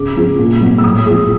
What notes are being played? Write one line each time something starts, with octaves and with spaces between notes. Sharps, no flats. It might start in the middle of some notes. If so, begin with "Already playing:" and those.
Already playing: C#3 D6
F3 G#3
A#2
F#3
E6
A2 D#6
F3 G#3